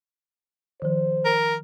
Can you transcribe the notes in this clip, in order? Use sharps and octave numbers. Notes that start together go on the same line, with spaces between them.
D#3 F3 C5
A#4